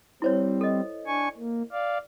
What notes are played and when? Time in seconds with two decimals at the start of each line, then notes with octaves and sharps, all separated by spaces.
0.22 G3 C4 E4 C5 C#5
0.61 A4 D#5
1.06 D4 G#5 C#6
1.38 A#3
1.72 D5 F5